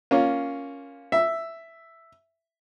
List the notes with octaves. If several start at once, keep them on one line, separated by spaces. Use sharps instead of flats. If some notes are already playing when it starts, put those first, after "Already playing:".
A#3 C#4 F4
E5